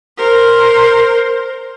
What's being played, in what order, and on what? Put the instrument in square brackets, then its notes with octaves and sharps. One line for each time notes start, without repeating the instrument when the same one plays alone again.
[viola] A#4 C5